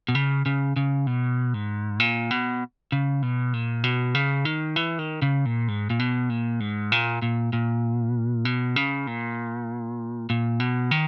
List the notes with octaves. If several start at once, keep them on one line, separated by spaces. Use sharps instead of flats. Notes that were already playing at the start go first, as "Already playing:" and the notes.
B2
C#3
C#3
C#3
B2
G#2
A#2
B2
C#3
B2
A#2
B2
C#3
D#3
E3
D#3
C#3
A#2
G#2
A#2
B2
A#2
G#2
A#2
A#2
A#2
B2
C#3
A#2
A#2
B2
D#3